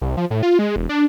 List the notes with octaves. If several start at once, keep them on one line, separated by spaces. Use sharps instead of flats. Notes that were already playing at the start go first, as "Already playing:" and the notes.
C2
F3
A2
F4
G#3
E1
D4